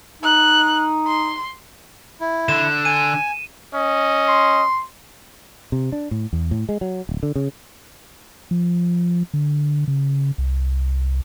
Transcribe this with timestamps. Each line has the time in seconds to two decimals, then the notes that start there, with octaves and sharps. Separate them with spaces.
0.23 D#4 F#6
1.07 C6
2.21 E4
2.48 D3 E7
2.85 G#5 D#7
3.75 C#4 D#5
4.28 C6
5.72 C3
5.92 D4
6.11 A2
6.33 E2
6.51 A2
6.69 G#3
6.81 F#3
7.09 D1
7.23 D3
7.36 C#3
8.51 F3
9.34 D3
9.88 C#3
10.38 C2